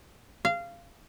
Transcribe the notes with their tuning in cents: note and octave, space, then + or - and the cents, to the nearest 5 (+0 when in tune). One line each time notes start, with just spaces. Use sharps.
F5 -20